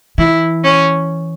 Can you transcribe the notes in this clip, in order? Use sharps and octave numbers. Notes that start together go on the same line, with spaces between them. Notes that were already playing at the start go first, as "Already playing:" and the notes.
E3 E4
C#4